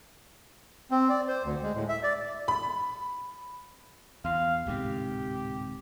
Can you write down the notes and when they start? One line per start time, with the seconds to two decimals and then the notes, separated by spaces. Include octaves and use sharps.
0.91 C4
1.09 D5
1.28 C5
1.44 D2
1.62 G#3
1.75 A2
1.89 E5
2.03 D5
2.48 B5
4.25 E2 F5
4.67 D1 G#2 C3 G4